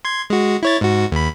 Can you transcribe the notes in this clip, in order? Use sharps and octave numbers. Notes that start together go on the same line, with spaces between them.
C6 G#6
G#3 F#4
E4 C#5 A6
G#2 F#4
D#2 B5